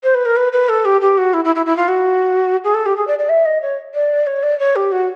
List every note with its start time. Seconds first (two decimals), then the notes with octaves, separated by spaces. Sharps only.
0.04 C5
0.15 B4
0.26 A#4
0.36 B4
0.52 B4
0.69 A4
0.85 G4
1.01 G4
1.18 F#4
1.34 E4
1.45 E4
1.55 E4
1.66 E4
1.77 F4
1.88 F#4
2.64 G#4
2.74 A4
2.86 G4
2.97 G#4
3.07 D5
3.19 D5
3.29 E5
3.45 D#5
3.62 C#5
3.95 D5
4.27 C#5
4.43 D5
4.60 C#5
4.76 G4
4.92 F#4